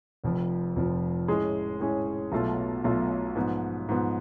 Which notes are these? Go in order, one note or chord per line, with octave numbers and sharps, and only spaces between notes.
F1 F2 F3
F1 F2 F3
A2 G#3 C#4 G#4
A2 G#3 C#4 G#4
B1 B2 A3 F4 A4
B1 B2 A3 F4 A4
G#2 F3 B3
G#2 F3 B3